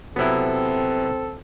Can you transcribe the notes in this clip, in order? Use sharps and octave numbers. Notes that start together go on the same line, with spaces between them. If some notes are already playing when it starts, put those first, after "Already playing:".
C3 F#3 B3 C4 E4 A4